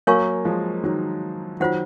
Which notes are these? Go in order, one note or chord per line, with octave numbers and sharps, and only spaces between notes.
F#3 A#3 A#4 C#5 F5 G#5 C#6
F3 G#3
D#3 F#3
D#3 F#3 F4 C5 F#5